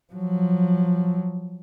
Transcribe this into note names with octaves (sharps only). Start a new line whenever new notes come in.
F3 F#3